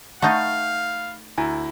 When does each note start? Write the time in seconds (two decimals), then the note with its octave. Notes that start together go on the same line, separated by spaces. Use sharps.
0.22 A3 D#4 F5 F#5 B5 C#6 G6 A6
1.38 D2 E4 G#5 A#5